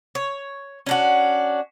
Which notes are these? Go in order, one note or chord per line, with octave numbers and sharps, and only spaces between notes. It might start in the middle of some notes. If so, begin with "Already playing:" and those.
C#5
C#4 D4 F#4